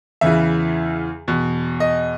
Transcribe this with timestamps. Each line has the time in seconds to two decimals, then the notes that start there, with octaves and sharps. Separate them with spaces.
0.21 E2 C#3 E3 E5
1.27 E2 B2
1.80 D#5